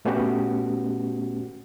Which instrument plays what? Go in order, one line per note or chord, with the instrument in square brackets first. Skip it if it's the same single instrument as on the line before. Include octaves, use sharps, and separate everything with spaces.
[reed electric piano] A#2 A3 B3 C#4 F#4 G4